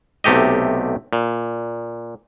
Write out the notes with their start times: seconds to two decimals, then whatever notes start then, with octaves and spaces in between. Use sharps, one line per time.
0.24 B1 C3 A3 G4 D#5
1.13 A#2